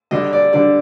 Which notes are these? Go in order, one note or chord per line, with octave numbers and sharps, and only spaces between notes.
D3 G3 D4 D#5
D5
D3 G3 D4 D5